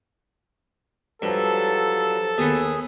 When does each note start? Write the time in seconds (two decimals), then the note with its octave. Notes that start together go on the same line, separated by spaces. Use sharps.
1.22 G2 F3 F#3 A4
2.38 D#2 B3 G#4 D#6